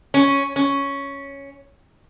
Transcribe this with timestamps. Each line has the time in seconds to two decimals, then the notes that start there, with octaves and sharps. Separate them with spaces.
0.14 C#4
0.56 C#4